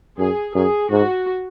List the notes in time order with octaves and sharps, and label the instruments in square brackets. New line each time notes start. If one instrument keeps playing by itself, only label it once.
[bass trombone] F#2 [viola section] G#4
[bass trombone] F#2 [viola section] G#4
[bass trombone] G#2 [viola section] F#4